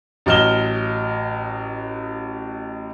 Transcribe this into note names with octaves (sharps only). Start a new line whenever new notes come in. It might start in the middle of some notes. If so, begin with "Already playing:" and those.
A1 F#3 D#5 F6 E7 G7